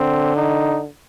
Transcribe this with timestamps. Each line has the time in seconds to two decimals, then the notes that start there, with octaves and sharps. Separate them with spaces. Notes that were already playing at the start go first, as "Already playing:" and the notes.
Already playing: D3 C4
0.36 D#4